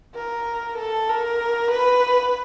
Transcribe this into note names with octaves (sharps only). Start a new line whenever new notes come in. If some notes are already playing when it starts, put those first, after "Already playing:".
A#4
A4
A#4
B4